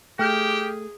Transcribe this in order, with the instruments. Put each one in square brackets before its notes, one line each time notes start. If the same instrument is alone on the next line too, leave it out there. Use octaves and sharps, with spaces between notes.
[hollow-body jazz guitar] A3 [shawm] G4 [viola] G#4 [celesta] G5 F6 G6